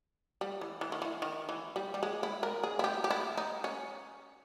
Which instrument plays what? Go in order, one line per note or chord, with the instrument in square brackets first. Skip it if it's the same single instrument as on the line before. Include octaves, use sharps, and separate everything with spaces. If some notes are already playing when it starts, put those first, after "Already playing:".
[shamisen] G3
E3
E3
D#3
E3
D#3
E3
G3
G3
G#3
E4
A#4
G#4
E4
G4
G4
E4
D#4
C#4